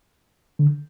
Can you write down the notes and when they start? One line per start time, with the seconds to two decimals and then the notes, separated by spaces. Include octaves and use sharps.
0.59 D3